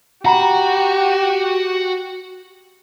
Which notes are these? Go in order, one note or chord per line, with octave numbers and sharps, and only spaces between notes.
F#4 G4 F#5 A#5 B5